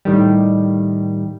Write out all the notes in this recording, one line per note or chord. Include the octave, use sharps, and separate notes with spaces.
A2 D#3 G3